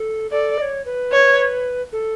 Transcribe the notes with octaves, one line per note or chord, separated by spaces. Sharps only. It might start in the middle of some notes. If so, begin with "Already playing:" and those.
Already playing: A4
A4 D5
D#5
C#5
B4
C#5
A4